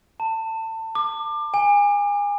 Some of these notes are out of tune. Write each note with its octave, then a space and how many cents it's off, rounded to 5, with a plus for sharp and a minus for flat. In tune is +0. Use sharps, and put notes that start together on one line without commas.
A5 +25
D6 +25
G#5 -30